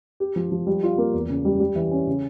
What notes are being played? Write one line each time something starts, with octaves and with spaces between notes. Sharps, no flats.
G4
F3
F3
G3
F4
A#3
E2
C#3
G3
G3
E3
C#4
C#3